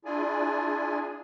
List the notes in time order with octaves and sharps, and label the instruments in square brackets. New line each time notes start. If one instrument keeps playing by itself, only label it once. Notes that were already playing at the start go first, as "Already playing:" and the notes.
[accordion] D4 E4 F4 G#4 D5 G#5